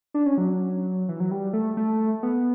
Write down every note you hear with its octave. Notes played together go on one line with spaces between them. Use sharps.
D4
C#4
F#3
E3
F#3
G3
A3
A3
B3